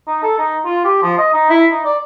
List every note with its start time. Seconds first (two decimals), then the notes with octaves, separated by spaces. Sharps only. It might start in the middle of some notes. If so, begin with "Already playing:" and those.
0.07 D#4
0.23 A4
0.39 D#4
0.66 F4
0.85 G4
1.03 F3
1.18 D#5
1.33 D#4
1.50 E4
1.72 D#4
1.85 D5